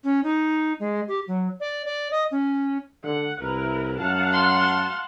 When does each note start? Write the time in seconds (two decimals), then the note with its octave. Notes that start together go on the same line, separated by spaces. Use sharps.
0.04 C#4
0.24 D#4
0.80 G#3
1.08 G4
1.28 F#3
1.60 D5
1.85 D5
2.11 D#5
2.31 C#4
3.04 D3 F#5
3.40 C2 E4 A#4 B4
4.00 F#2 F5 F#5 A5
4.33 C6